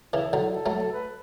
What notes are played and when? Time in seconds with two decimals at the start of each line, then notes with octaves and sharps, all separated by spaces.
0.13 C#3 E3 E4
0.33 D3 F#3
0.40 E4
0.53 A4
0.66 F#3 A3
0.92 B4